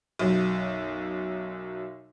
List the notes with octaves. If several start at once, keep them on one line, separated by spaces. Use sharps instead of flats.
B1 F#2